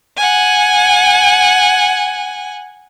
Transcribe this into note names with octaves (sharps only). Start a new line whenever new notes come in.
F#5 G#5